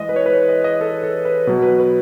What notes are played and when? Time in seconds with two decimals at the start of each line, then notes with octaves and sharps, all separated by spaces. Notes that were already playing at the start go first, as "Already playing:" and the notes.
Already playing: E3 G#3 D#5
0.09 B4
0.16 C#5
0.26 B4
0.33 C#5
0.49 D#5
0.64 D#5
0.81 A4
1.03 A4
1.25 B4
1.47 B2 F#3
1.62 B4
1.80 B4